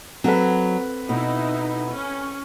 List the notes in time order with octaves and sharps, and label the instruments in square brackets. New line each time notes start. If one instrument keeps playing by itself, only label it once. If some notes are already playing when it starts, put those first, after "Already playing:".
[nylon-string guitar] F#3 [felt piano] C4 A4 B4
[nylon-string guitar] B2 [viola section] D#4 E4
[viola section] C#4